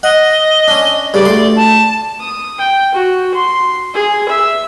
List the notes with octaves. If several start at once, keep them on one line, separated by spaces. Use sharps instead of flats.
D#5 F#5
C#4 D4
G2 C#3 D5
D2 C6
A5
D#6
G5
F#4
C6
G#4
E5